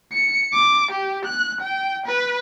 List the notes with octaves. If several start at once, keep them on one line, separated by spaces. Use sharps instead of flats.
C#7
D6
G4
F#6
G5
B4